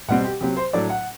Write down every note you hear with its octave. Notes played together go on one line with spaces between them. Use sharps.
B2 G3 C4 F#5
G4
C3 F#3 C4 G4
C5
A2 F#3 A3 D4 D5
F#5